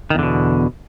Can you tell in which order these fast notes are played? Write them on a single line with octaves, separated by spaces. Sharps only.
D#3 E2 D3 B2